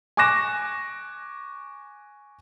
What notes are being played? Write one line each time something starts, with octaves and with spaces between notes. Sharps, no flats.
G#5 C#6 D6 F#6 A#6 E7